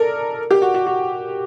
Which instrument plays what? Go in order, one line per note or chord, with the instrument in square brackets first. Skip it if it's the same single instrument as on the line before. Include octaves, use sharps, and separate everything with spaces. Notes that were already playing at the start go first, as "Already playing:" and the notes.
Already playing: [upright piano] A4 A#4 D5
G4
F#4
F#4
F#4